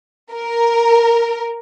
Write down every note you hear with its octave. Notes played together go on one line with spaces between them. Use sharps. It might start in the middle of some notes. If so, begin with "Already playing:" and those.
A#4